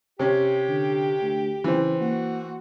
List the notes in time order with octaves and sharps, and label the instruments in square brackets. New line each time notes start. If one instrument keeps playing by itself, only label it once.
[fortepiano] C3 C#4 [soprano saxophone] G4
[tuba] D3
D2
[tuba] C#3 [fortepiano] E3 C4
[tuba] A#3 [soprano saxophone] F#4